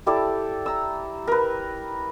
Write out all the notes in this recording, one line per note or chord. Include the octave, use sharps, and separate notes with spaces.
E4 G4 A4 D5
A#5 E6
A#4 B4